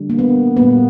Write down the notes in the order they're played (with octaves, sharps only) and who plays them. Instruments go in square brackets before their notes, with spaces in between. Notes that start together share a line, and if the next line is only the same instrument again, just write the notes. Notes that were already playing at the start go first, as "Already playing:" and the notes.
Already playing: [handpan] D3 G3
A#3
B3
A#2 G3 A#3 B3